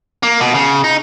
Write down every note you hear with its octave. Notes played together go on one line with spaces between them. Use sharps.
A#3
B2
C#3
D#4